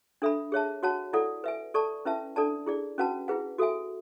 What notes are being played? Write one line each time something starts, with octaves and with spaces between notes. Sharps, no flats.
D4 A4 E5 B5
G#4 C#5 E5 A5
F#4 C#5 F#5 A5
E4 A4 D5 F#5
B4 E5 G#5
A4 D5 A5 C#6
C#4 E4 B4 E5 A5
D4 A4 D5 A5
E4 G#4 D5
C#4 F#4 B4 F#5 A5
E4 G#4 B4 F#5
F#4 A4 E5 G#5